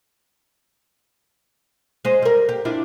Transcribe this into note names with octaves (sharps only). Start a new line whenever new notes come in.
G#3 C5
G3 A#4
G4
D4 E4 F4